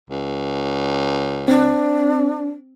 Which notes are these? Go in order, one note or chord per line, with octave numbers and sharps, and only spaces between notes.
C#2
C4 D4